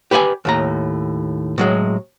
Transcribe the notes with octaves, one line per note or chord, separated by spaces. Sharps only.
G4 B4 D5 F#5 G#5
D#2 A2 A#5
A2 F#3 G#3